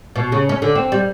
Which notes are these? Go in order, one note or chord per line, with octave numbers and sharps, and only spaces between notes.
B2
C#3
C#4
D3
C4
G3